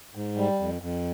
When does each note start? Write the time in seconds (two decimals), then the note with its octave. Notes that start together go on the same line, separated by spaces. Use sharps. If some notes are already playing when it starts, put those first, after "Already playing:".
0.15 G#2
0.37 G3
0.60 F2
0.82 F2